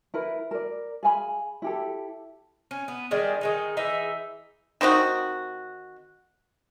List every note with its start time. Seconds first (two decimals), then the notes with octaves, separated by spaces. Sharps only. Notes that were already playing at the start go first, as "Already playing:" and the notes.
0.14 E4 A#4 B4
0.51 A#4 D5
1.03 G#4 F5 G#5 B5
1.62 E4 G4 A4
2.71 C#4
2.88 B3
3.11 D#3 G3 G#3 D4
3.41 D#3 G#3 D#4
3.77 E3 D#4 G#4 E5
4.81 D#3 C4 D#4 F#4